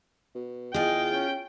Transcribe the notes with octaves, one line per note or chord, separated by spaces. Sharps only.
B2
E2 F4 G#4 D#5 G5
C#4